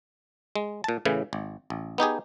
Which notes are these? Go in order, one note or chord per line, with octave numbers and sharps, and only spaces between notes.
G#3
A#2 A5
A2 C#3 E3
G#1
A1
B3 D#4 G4 G#4